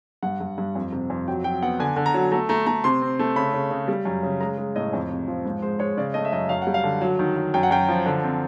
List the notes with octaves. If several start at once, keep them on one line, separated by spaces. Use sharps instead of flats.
G2 F#5
G2
G2
F2
C3
F2
F#3 G5
F#3 G5
B3 F#5
D3 G#5
D3
A#5
F#3
A3 A#5
A3 A#5
A3 A#5
C3 C6
C4
A3
C#3 B5
C#3
C#3
G3
F#2
C#3
G#3 A#5
G#3
A2 D#5
F2
C3
F3
G#2
G#3 C5
G#3 C#5
C#3 D5
A3 D#5
E5
F#2 D#5
F#2 F5
F#5
G3
F5
D3
F#3
D#3
F#3
F#2 G5
F#5
F#2 G5
F3
D3
C4